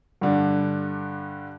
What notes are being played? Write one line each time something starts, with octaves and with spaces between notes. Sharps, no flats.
G2 D3